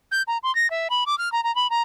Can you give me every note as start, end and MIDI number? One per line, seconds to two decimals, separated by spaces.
0.12 0.22 91
0.28 0.38 82
0.43 0.54 84
0.55 0.70 94
0.70 0.88 76
0.90 1.04 83
1.06 1.18 86
1.18 1.31 89
1.32 1.43 82
1.44 1.54 82
1.55 1.70 83
1.70 1.83 82